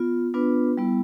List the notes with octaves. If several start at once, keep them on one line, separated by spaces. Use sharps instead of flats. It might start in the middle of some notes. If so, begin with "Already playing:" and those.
Already playing: B3 F4
B3 D4 F4 B4
G3 B3 E4